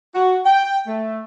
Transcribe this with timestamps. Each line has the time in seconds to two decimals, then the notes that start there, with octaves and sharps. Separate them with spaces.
0.14 F#4
0.44 G5
0.86 A3